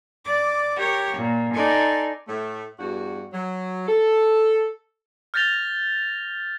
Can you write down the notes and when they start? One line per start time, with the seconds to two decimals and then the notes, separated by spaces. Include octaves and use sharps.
0.25 D5 D6
0.76 G4 A#4 C#5
1.17 A#2
1.53 D#4 A4 D5 G#5 C6
2.28 A2 A3
2.79 E2 G2 F#4
3.33 F#3
3.87 A4
5.34 F6 G6 A6 A#6 F7 G7